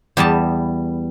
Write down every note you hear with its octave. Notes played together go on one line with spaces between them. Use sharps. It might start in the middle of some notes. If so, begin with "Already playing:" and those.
E2 G3 B3 A5